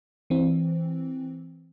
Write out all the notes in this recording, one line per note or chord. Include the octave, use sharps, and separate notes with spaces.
E3 C4